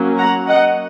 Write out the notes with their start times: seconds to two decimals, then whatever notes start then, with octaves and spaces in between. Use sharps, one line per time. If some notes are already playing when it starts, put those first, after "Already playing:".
Already playing: F#3 A#3 C#4
0.18 F#5 A#5
0.48 D#5 F#5